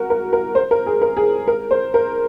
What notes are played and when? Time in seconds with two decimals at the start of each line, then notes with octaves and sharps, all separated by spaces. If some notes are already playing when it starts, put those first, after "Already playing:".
Already playing: F#4 A#4
0.10 A#4
0.33 A#4
0.55 C5
0.71 A#4
0.86 G#4
1.02 A#4
1.17 G#4
1.48 A#4
1.71 C5
1.94 A#4